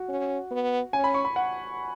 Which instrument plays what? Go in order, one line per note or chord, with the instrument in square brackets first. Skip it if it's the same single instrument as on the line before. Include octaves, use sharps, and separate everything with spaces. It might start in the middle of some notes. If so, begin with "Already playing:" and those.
Already playing: [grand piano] F#4
[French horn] C#4
B3
[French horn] C#4 [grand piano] G#5
[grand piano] B5
C#6
B5
F#5